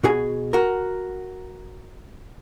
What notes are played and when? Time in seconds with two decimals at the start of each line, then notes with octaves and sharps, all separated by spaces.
0.04 B2 F#4 G#4 G#5
0.53 F#4 A#4